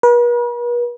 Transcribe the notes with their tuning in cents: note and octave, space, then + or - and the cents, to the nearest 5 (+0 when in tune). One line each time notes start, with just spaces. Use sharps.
B4 -45